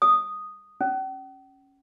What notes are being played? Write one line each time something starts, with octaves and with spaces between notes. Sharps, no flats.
D#6
C#4